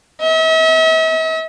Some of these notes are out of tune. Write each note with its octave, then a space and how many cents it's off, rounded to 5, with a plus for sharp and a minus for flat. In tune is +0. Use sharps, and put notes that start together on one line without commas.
E5 -45